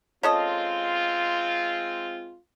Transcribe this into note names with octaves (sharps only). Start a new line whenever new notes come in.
G#3 C4 C#4 F4 A4 D#5